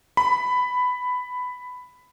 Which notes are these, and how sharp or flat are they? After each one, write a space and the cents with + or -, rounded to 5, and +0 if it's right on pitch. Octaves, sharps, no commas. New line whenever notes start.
B5 +10